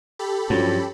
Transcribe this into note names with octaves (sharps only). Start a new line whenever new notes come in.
G4 A4 B5
G2 F3 F#3 C#4